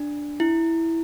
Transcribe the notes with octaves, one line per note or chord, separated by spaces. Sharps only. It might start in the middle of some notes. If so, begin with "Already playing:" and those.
Already playing: D4
E4